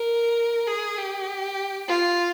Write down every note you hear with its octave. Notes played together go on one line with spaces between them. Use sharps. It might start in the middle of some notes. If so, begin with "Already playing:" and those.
Already playing: A#4
G#4
G4
F4